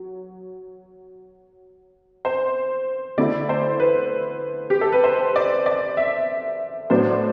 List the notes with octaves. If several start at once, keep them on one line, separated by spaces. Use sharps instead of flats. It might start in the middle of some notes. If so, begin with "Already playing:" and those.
Already playing: F#3
C5
D3 A3 E4 D5
C5
B4
G4
A4
B4
C5
D5
D5
E5
A2 F#3 B3 D4 C5